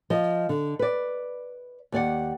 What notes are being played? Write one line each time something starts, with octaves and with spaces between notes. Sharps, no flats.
F3 D#5
D3
B4 D5
D#2 D5 F#5